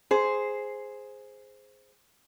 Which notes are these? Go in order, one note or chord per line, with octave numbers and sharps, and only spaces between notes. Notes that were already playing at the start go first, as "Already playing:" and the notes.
G#4 C5